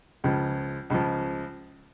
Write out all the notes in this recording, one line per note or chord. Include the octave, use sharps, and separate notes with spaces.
C#2 C#3 F3
C#2 C#3 F3